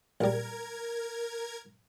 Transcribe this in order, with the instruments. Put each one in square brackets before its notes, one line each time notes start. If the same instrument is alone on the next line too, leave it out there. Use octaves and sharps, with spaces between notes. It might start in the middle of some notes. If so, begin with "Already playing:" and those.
[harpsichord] A#1 G3 [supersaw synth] A#4 G#6